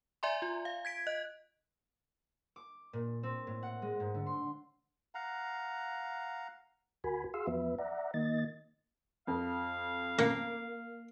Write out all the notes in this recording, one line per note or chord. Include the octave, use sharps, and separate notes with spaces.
D5 E5 G#5 A#5 C6
F4
F5
G#6 B6 D7
D#5 F#6
D6
A#2
C4
A2
F#5
G#3
G#2
D3
C6
F5 F#5 A#5
D2 F#4 A#4 G#5 B5
F#4 G#4 F5 C6 E6
E2 F3 B3 B4 E5
D5 E5 F#5 A#5
D#3 A#3 D#5 A6
F2 C4 F5
A1 A2 A#3 F#5